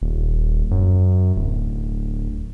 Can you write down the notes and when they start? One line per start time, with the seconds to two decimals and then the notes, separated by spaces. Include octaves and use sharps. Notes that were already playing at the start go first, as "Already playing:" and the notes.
0.01 D#1
0.71 F#2
1.36 D1